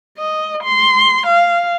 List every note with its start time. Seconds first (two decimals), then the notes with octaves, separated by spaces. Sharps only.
0.18 D#5
0.64 C6
1.26 F5